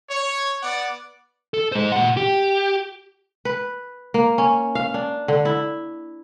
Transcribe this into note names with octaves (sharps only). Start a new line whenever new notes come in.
C#5
B3 D5 F#5 D6
A4
G#3 C5
A#2 F#5
G4
B4
A#3
C#4
F5
D4
D3
E4